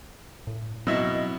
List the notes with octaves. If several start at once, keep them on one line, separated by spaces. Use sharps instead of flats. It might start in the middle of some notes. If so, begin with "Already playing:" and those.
A2
B2 F#3 C4 D#4 E4